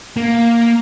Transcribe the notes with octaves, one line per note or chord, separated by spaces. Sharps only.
A#3